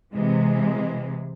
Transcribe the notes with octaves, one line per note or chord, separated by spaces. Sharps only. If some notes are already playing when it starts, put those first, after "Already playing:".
C3 E3 G#3